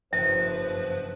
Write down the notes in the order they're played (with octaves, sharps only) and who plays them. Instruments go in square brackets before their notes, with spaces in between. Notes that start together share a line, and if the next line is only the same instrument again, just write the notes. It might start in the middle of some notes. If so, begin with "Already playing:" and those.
[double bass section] F#1 [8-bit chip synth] G2 F3 B4 [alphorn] C5 [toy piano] E5